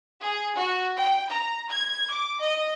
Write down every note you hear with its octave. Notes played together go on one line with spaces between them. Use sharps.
G#4
F#4
G5
A#5
G#6
D6
D#5